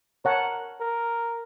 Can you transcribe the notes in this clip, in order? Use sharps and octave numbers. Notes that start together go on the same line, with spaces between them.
A#4 C#5 F#5 A5
A#4